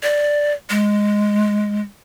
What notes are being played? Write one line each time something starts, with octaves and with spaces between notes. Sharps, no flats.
D5
G#3